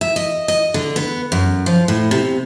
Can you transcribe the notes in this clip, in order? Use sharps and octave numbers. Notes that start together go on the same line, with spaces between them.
E5
D#5
D#5
D3
B3
F#2
F3
A2
C3